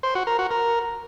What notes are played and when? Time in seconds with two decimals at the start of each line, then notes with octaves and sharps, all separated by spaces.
0.03 C5
0.15 F#4
0.27 A#4
0.39 F#4
0.51 A#4